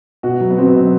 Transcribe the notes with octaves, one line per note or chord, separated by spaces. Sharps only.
B2 F#4
F#3
B3
F#3 C4
B2